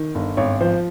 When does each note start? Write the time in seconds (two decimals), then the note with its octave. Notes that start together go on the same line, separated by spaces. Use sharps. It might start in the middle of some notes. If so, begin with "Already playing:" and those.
Already playing: D#3
0.15 G1
0.37 G#1 C#5
0.61 F3 C5